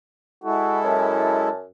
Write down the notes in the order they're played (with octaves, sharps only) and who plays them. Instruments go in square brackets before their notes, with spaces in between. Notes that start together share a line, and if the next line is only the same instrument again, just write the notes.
[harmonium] G#3 E4 A4 [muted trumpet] F#4
[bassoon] F#2 [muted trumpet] A5